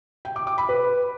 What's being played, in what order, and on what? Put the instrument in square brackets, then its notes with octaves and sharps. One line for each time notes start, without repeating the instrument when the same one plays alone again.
[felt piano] G5
D6
D6
B5
B4